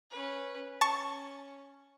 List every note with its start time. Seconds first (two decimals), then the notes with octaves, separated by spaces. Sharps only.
0.11 C#4 B4
0.81 C#4 A5 C#6